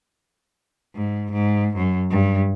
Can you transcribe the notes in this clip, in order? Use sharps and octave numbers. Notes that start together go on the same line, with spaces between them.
G#2
G#2
F#2
G2